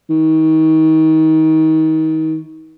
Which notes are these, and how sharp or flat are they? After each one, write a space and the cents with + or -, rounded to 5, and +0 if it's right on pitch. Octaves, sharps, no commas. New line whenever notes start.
D#3 +30